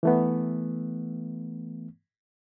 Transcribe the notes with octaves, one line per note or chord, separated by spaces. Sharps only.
E3 A3 B3